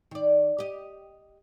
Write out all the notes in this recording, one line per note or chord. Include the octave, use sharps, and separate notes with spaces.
D#3 D5
G4 D#5